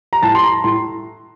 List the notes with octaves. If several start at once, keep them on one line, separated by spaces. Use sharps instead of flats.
A#5
A2 A5
C6
A#5
A2 C6